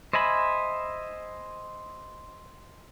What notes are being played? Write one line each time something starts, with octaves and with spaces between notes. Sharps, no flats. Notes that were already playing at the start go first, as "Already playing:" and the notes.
C5 D#5 E5 G#5 B5